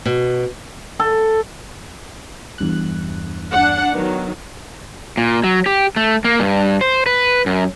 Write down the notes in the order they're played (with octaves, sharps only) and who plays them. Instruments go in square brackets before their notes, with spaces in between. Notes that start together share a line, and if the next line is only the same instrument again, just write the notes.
[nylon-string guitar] B2
[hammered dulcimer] A4
[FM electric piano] E2 G2 F#6
[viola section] D4 F#5
[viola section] D#3 F#3 [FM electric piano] B3
[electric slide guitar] A#2
F#3
G4
A3
A#3
G2
C5
B4
F#2